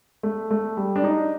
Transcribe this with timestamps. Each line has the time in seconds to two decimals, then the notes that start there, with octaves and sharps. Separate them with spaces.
0.23 A3
0.51 A3
0.77 G3
0.96 D4
1.04 D#4